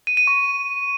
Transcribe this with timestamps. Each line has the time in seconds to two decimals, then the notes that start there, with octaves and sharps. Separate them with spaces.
0.07 D#7
0.17 D#7
0.27 C#6